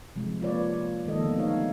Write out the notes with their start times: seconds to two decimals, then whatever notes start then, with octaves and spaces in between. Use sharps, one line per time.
0.16 C3 F3 G#3
0.42 A#3 F4 B4 C#5 D5
1.05 D#3 F3 G#3 A#3 A4 D#5
1.22 D3 D#3 B3 D4
1.38 A3 D#4 G4 C#5 F5